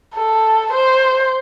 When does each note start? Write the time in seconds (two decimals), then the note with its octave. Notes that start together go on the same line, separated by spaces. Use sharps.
0.15 A4
0.73 C5